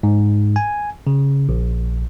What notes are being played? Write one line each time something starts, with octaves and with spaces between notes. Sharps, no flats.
G#2
G#5
C#3
A#1